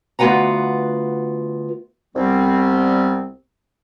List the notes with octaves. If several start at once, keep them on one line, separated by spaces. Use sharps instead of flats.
D2 B3 F4 B4 F#5 A#5
C2 G3 B3 C4